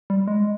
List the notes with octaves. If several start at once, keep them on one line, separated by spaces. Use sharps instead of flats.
G3
G#3